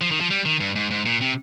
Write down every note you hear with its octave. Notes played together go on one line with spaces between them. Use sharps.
F3
D#3
F3
G3
D#3
G2
G#2
G#2
A#2
C3